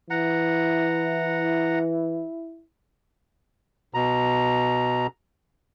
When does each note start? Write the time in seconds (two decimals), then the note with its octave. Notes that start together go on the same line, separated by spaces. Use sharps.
0.10 E3 E4 F#5 A#5
3.94 B2 A#5